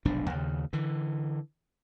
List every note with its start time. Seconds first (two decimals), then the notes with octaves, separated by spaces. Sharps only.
0.05 F1 B1 G#2 D4
0.30 D#2 C#3
0.73 D3 E3